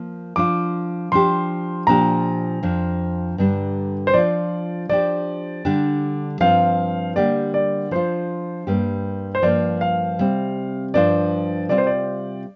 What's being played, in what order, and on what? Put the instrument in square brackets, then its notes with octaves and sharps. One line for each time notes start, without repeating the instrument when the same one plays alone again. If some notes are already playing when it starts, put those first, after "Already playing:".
Already playing: [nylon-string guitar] F3 A#3
[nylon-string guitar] F3 D4 F4 [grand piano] D6
[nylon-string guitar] F3 D4 G4 [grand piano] C6
[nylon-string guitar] A#2 F3 D4 G4 [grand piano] A#5
[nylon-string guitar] F2 F3 D4
G2 D3 G3 D4
[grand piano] C5
[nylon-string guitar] F3 D4 F4 [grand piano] D5
[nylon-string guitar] F3 D4 G4 [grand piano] D5
[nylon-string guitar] D3 G3 D4 G4
[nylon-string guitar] G2 F3 C4 F4 [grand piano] F5
[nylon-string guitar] D3 G3 A#3 G4 [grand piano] D5
[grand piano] D5
[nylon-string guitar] F3 D4 F4 [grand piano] C5
[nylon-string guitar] G2 G3 A#3 G4
[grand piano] C5
[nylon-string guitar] G2 F3 A#3 F4 [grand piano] D5
[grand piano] F5
[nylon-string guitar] C3 G3 C4
[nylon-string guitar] G2 F3 D4 F4 [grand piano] D5
[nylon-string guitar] C3 G3 C4 F4 [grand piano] D5
[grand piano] C5
D5